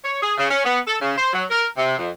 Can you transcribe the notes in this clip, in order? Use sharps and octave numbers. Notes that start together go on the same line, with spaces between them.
C#5
G#4
C#3
C#4
B3
A4
C#3
C5
F#3
A#4
C3
F2